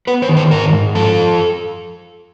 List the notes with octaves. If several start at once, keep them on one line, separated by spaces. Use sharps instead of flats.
B3 B4
C5
D#3
C5
G#2 A#4
G#2
F3 A4